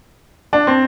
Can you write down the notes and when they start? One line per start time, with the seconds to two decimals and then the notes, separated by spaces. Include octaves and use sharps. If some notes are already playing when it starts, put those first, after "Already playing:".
0.53 D4
0.67 C4